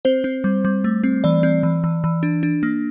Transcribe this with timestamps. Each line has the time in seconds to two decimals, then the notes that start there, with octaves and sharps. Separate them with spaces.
0.05 C4 C5
0.24 C4
0.44 G3
0.65 G3
0.84 A3
1.04 C4
1.24 E3 D5
1.43 C4
1.63 E3
1.84 E3
2.04 E3
2.23 D4
2.43 D4
2.63 A#3